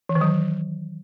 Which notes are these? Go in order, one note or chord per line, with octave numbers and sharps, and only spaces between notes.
E3
D#3
F#3